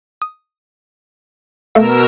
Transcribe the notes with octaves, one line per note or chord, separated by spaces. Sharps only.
D#6
B2 A3 A4 A#4 F5 E6